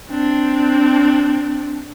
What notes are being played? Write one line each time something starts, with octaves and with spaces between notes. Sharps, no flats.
C4 D4